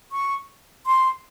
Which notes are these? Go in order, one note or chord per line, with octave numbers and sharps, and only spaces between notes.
C#6
C6